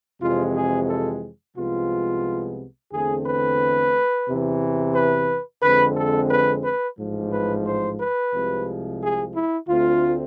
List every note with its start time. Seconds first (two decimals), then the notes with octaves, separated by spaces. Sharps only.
0.21 F2 C3 E3 G#3 C4 F4
0.56 G#4
0.89 A4
1.56 C2 C3 F3 G#3 B3 F4
2.92 E2 D3 A3 C4 G#4
3.27 B4
4.27 E2 C3 E3
4.95 B4
5.62 F2 D3 G#3 C4 B4
5.97 A4
6.31 B4
6.64 B4
6.98 A1 G#2 F3
7.32 B4
7.66 C5
8.00 B4
8.34 C2 C3 F3 G#3
9.02 G#4
9.35 E4
9.68 D2 D3 A3 C4 F4